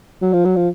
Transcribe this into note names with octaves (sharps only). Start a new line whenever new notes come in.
F#3
F3
F#3
F3